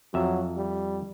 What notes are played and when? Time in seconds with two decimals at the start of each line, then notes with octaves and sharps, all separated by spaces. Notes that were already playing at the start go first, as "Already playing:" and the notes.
0.14 F2 F#3 E5
0.57 G3